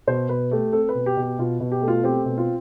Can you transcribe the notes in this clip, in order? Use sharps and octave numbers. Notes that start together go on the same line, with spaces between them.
B2 C5
B2 B4
A3 G4
C4 A4
B4
B2
G4
B2
G4
B2 F4
B2
G4
A3
F4
C4 G4
B2
F4